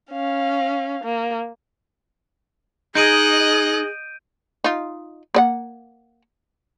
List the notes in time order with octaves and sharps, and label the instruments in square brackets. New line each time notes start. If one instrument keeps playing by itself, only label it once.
[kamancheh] C#4 F5
A#3
[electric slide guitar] D#4 [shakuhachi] G#4 [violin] D#5 F#6 [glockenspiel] G6 D7 D#7
[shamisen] D#4 F4
A#3 D5 F#5